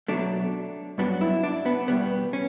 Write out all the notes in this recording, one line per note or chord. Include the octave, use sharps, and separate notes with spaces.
B2 F#3 A3 D4
G2 F#3 B3 D4
E4
D4
B3
E2 B2 G3 B3
C#4